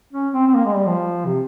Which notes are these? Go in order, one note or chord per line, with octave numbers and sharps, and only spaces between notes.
C#4
C4
C4
A#3
G#3
G3
F3
C3